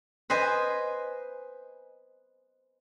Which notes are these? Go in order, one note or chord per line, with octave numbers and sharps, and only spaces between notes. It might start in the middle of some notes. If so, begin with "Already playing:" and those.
B4 C5 D#5 G#5